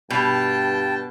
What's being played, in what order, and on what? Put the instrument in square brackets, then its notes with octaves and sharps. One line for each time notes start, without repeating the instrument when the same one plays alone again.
[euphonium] G2 [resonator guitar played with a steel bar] B2 [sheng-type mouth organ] G5 A5